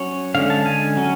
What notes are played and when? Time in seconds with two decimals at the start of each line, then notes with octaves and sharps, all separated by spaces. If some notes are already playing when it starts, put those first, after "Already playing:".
Already playing: F#3 C#4 C#5
0.35 D3 G#3 C#4 F5
0.50 A5
0.66 G#5
0.97 F#3 C#4